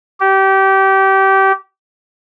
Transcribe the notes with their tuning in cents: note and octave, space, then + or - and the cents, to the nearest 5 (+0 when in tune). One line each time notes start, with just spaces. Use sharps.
G4 -25